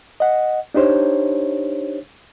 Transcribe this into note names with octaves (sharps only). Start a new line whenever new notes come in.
D#5 F#5
D4 D#4 G4 C5 C#5